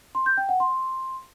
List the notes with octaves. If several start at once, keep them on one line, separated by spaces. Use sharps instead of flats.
C6
G6
G5
F#5
C6